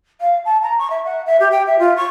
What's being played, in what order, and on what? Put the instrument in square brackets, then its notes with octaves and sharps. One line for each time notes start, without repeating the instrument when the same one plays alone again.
[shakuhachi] F5
A5
A#5
C#6
E5
F#5
E5
G4
G5
E5
F4
C#6